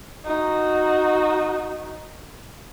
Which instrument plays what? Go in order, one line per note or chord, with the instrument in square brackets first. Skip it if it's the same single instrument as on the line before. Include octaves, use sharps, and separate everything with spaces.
[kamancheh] D#4 F#4